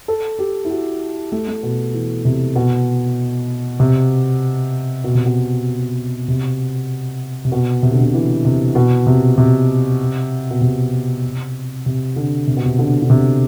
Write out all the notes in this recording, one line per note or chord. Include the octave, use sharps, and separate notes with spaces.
A4
G4
E4
F#4
A3
A3
B2
E3
C3
B2
C3
B2
C3
B2
C3
C3
B2
C3
D3
C3
E3
C3
B2
C3
C3
B2
C3
C3
D3
C3
B2
C3
D3
D3
C3